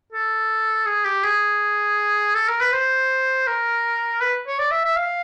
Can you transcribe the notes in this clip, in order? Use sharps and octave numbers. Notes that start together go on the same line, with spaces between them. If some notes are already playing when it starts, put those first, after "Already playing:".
A4
G#4
G4
G#4
A4
A#4
B4
C5
A#4
B4
C#5
D5
E5
E5
F5